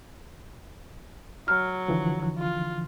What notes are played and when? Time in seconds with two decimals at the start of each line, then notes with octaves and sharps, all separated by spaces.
1.48 F#3 F6
1.88 D3 E3 F3
2.38 F4